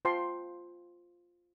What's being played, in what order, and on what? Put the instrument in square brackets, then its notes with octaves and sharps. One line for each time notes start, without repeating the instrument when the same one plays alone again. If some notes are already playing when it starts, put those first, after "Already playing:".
[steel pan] F4 C5 G5 A5 C6